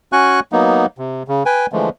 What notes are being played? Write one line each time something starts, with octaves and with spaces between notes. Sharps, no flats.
C#4 F#4 G#5 C#6 F#6
F#3 A#3 B3 D#4
C3
C#3
B4 G5 G#5
D3 E3 F3 G#3 A3